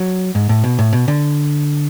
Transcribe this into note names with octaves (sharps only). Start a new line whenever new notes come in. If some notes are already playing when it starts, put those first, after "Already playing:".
Already playing: F#3
G#2
A2
B2
A2
B2
D3